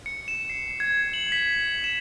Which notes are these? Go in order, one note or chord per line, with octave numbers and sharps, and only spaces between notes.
C#7
E7
C7
G#6
F#7
B6
E7